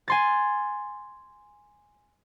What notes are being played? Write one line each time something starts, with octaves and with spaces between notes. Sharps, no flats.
G#5 C6 A6